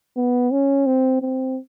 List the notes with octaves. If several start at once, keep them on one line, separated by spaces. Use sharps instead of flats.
B3
C#4
C4
C4